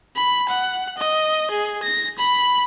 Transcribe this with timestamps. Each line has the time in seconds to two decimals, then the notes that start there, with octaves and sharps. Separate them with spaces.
0.16 B5
0.49 F#5
0.98 D#5
1.51 G#4
1.83 A#6
2.19 B5